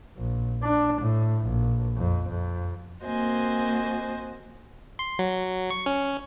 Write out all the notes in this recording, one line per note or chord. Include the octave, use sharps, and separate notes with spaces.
A#1
D4
A2
A#1
F2
F2
A#3 C4 F#4 C5 D#5 G#5
C6
F#3
C#6
C#4